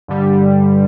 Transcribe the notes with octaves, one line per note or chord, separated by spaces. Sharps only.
G2 D3 G3